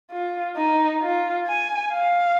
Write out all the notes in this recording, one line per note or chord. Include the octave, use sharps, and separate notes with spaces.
F4
D#4
F4
G#5
F5